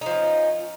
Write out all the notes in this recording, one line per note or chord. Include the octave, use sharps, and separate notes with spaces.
F3 C#4 D#4